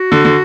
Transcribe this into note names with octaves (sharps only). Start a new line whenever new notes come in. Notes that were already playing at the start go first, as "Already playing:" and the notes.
Already playing: F#4
D3
D3